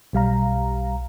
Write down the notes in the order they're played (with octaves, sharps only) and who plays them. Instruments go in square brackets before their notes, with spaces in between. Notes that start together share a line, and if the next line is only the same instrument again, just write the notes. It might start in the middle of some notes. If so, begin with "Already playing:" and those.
[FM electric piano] B1 G3 F5 A#5